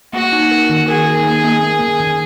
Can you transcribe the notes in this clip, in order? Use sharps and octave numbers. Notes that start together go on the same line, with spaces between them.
A#3 F#4
D#4
A#4
D#3
G#4 A#4
A#4
A#3
A#3
A#3
D#3
D#3